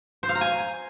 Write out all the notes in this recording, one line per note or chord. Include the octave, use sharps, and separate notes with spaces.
C5
F5
A#5
G#5